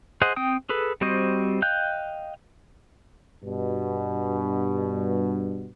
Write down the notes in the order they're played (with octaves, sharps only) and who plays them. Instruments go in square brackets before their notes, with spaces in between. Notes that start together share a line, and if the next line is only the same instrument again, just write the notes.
[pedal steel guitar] G#4 C5 D#5 F#5
C4 G5 D#6
G#4 A4 B4
G3 C4 F#4 C5 D#5
D#5 F5 G5 F#6 G6
[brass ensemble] G2 B2